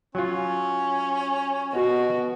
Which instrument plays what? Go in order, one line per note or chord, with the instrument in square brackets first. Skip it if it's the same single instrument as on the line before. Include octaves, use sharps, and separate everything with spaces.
[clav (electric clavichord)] F#3 F4 [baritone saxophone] C#4
[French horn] B2 [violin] F#4